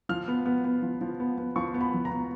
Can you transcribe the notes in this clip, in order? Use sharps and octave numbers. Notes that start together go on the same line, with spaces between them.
F3 F6
B3
B3
B3
F3
F3
B3
B3
F3 C#6
B3
B5
F3
A#5
B3